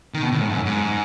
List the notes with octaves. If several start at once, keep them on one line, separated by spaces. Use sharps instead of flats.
D#3
B2
A2
G#2
F#2
G#2